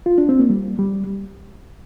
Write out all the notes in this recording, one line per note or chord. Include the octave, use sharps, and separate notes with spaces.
F4
D4
C4
A#3
G3
G3